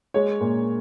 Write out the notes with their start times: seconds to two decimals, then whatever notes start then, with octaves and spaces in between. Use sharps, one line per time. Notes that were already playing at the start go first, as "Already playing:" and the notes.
0.14 G#3 C#5
0.40 A#2